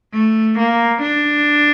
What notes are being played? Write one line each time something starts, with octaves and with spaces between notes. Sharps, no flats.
A3
A#3
D4